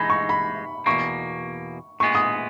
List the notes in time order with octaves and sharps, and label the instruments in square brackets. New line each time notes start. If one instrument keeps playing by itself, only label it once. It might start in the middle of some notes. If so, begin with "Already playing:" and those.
Already playing: [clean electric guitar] E3 G#3 D#4 [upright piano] B5
[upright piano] C#6
B5
[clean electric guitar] E2 B2 A#3 [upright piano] C#6
[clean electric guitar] A#2 G#3 B3 [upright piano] C#6
[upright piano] D#6